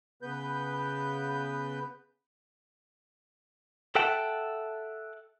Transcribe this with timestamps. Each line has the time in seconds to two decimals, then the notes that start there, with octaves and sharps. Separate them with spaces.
0.22 C#3 B3 B4 G6
3.95 A4 E5 F#5 G5 A5